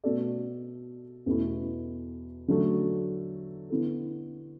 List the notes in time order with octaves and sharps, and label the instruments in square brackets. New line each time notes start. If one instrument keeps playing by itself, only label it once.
[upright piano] B2 A3 F#4 A4 D5
E2 B2 A3 E4
D3 F#3 A3
D3 B3 E4 A4